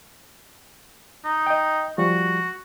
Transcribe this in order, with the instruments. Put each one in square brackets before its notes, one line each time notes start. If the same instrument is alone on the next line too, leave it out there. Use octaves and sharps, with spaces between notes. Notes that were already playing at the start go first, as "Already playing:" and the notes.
[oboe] D#4
[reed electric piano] D#5 G5
[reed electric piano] F3 G3 [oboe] F#4